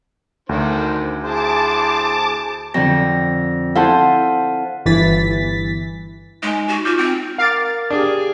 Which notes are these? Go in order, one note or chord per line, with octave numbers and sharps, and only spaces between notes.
D2 D3 D#3 C5
E4 G#4 C5 A5 D6
F2 D3 A#6
E4 A4 C5 F5 F#5 A5
G1 E3 A6 B6
G#3 D#4 G#5
F#4
F4 F#4 D6 G6
C4
A#4 F5 D6 A6
D4 G4 G#4